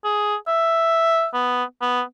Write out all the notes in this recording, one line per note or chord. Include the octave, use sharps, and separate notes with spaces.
G#4
E5
B3
B3